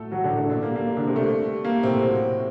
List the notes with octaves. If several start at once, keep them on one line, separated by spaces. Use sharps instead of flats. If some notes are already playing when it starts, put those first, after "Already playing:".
Already playing: A2 F#3 A3 A4
F#3 F#4
D3 D4
A2
D3 D4
A#2 D3 D4
A#3
G3
A#3
G3
D3 D4
C3 G3 C4
A3
G3
G3
G3 A#3
A2 C3 C4
F#3
C3